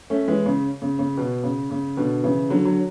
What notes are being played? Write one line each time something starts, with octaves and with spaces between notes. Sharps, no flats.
A3 C#4
E3 G#3
C#3
C#3
C#3
B2
C#3
C#3
B2 D3
C#3 E3
D3 F#3
F#3